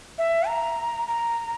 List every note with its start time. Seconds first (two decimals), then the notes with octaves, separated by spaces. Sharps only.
0.18 E5
0.47 A#5
1.08 A#5